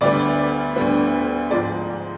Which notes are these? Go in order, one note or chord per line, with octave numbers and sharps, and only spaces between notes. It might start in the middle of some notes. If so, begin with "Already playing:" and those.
D2 D3 G3 B3 D5
D2 D3 G3 B3
G#2 F3 G#3 D5